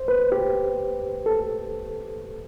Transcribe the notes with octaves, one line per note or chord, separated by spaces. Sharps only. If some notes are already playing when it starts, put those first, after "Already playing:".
Already playing: C5
B4
G4
A4